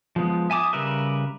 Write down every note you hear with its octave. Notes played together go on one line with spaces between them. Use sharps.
F3 G#3 B3
E5 G#5 A5 D6 D#6
C#3 G3 A#4 B4 E5